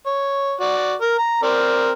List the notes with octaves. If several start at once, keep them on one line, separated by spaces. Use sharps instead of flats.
C#5
F#4 D5
A#4
A#5
C4 A#4 D5